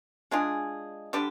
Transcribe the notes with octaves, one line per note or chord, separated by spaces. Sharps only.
G#3 D4 F4 G#4
D3 G3 D4 G4